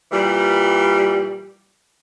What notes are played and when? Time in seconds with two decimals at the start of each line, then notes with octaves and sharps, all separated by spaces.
0.12 A#2 E3 G3